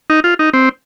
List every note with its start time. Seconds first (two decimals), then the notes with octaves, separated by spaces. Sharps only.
0.10 D#4
0.24 F4
0.39 D#4
0.53 C4